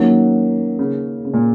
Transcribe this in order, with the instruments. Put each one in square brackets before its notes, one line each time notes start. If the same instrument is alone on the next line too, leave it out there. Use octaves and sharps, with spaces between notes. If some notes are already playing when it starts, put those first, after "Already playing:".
Already playing: [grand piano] D#3 A#3 C#4 F#4 [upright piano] F#3
[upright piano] C#3
C#3
A#2